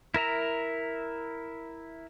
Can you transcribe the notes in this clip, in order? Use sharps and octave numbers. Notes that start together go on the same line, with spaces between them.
E4 A#4 E5 A#5